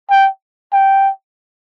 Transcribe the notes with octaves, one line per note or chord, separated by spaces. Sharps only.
G5
G5